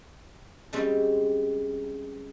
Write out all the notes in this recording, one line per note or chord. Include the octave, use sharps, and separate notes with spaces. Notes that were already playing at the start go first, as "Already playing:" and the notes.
C#3 G3 G#3 C4 C#4